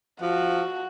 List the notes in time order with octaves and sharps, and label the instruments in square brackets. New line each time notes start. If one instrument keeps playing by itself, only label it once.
[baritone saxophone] F3 [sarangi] F#4